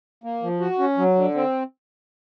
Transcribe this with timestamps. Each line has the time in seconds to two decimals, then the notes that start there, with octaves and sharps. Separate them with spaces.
0.24 A#3
0.43 F3
0.60 F#4
0.79 C#4
0.98 F#3
1.15 D3
1.35 C4